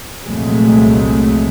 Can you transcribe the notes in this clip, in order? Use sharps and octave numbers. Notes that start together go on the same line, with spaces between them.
C2 F2 A#2 F#3 G#3 A3